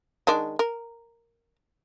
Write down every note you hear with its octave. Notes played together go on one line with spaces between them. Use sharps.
D#3 G#3 D4
A#4